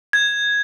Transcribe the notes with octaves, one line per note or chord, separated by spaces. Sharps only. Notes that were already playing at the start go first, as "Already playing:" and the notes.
G#6